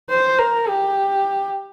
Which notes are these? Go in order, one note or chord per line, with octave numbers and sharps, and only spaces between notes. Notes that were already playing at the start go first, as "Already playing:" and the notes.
C5
A#4
G4